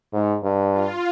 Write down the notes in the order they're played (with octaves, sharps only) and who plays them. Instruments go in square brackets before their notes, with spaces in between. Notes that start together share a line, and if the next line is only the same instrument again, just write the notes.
[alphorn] G#2
G2
[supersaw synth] F4